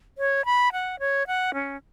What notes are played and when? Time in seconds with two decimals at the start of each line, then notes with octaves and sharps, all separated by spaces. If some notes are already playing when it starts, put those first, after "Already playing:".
0.18 C#5
0.45 B5
0.72 F#5
1.00 C#5
1.27 F#5
1.54 C#4